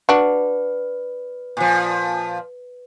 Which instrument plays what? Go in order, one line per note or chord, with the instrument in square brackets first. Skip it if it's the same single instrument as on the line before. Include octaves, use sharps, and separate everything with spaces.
[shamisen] D4 F#4 [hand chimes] B4
[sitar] A#2 F3